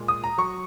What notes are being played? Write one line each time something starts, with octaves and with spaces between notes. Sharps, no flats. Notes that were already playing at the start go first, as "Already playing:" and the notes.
Already playing: A#2 G#3
D#6
A#5
F#3 C#6